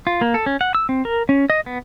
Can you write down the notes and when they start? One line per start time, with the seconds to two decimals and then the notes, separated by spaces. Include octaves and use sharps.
0.07 F4
0.21 A#3
0.34 A4
0.46 C#4
0.61 F#5
0.75 E6
0.89 C4
1.05 A#4
1.29 C#4
1.50 D#5
1.66 B3